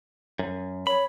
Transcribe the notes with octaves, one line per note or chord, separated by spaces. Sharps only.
F#2
C#5 B5